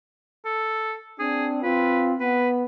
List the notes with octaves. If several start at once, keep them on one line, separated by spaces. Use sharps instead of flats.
A4
C4 D4 G#4
C4 F4 B4
B3 B4